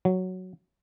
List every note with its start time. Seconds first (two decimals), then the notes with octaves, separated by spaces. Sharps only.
0.05 F#3